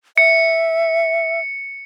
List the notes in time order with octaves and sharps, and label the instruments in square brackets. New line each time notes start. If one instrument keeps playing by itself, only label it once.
[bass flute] E5 [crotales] C#7